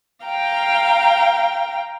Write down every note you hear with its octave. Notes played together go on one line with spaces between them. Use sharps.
F5 G5 A#5